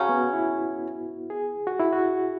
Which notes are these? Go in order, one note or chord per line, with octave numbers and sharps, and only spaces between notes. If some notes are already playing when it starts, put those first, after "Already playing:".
Already playing: C#3 F#3 C#4 F#4
B3
E4
G#4
F#4
E4
F#4